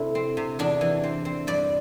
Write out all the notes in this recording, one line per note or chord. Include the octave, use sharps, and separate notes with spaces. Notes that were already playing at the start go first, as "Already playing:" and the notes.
Already playing: C3 D4 E4 A4
C4
C3
E2 D4
E3
C4
C4
G2 D5